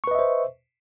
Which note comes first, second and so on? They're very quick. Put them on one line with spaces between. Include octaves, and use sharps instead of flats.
C#6 B4 D#5 E5 C5